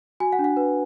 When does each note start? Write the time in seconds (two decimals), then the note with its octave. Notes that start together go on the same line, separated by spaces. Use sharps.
0.20 F#4 G#5
0.33 F#5
0.39 D4
0.44 F#5
0.57 B4